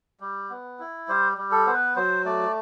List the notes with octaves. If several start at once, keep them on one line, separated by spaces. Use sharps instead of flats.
G3
B3
E4
G3 C5
G3
A4
B3 C5
B4
F#3 C5
A3 D5